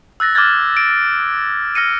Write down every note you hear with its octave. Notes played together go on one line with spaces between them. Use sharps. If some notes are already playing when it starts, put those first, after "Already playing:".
E6 F#6 A6 A#6
D6 F6 F#6 G#6 A6
D7
F6 A#6 C#7 D#7